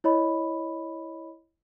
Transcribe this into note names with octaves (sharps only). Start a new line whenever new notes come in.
E4 C#5 D#5 B5